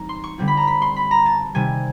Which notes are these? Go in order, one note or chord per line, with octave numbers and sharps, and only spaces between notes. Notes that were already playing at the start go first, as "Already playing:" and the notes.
Already playing: E3 G3 C4 D#4 A#5
C6
C#6
D3 G3 C4 F4
B5
A#5
B5
C6
B5
A#5
A5
C3 D#3 G3 G#5